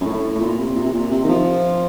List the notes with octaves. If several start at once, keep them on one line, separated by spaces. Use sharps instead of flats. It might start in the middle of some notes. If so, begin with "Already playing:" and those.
F#2
A2
A2
A#2
C3
A#2
C3
A#2
C3
D#3
F3